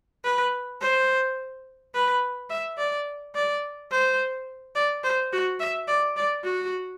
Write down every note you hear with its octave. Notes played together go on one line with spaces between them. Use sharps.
B4
C5
B4
E5
D5
D5
C5
D5
C5
F#4
E5
D5
D5
F#4